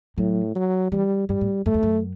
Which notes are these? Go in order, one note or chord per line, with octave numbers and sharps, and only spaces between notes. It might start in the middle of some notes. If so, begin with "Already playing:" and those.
A2 F#3
F#3
E3 G3
G2 G3
A2
F#2 A3
E2
F#2